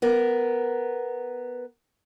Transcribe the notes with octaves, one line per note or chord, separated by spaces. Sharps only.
B3 A#4